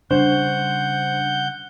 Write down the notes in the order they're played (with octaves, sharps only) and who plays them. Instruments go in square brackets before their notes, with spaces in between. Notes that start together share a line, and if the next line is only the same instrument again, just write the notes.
[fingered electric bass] C#3 G3 [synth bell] D4 [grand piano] C5 [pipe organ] F#5 G6